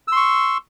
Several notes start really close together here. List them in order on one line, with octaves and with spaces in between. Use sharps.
E6 C6 C#6